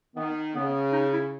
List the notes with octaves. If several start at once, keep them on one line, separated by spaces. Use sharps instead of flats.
D#3 B3
C#3 B3
D#4
E4